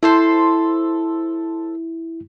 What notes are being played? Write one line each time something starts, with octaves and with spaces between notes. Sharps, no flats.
E4 A4 C5 C6